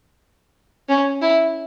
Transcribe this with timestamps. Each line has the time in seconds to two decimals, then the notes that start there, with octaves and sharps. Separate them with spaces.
0.89 C#4
1.22 E4